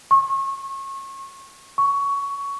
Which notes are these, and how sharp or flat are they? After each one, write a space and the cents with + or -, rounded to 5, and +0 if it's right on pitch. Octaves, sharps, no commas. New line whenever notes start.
C#6 -30
C#6 +15